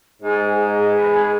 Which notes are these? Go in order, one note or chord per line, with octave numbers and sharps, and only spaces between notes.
G#2 G#4
G#4
D#5
B4
G#4